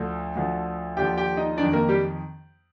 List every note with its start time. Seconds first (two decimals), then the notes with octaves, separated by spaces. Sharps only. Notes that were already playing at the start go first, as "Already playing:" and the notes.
Already playing: D2 D3 F3 A4
0.36 D2 D3 F3
0.97 D#2 D3 F3 G4 G5
1.17 G4 G5
1.37 D#4 D#5
1.58 F2 D#3 D4 D5
1.73 A#3 A#4
1.89 G3 G4